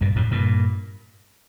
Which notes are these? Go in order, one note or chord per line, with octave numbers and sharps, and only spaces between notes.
G2 A#2
F2 A2
G2 A#2